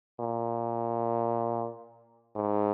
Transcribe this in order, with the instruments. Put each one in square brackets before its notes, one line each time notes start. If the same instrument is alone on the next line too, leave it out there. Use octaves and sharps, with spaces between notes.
[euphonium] A#2
G#2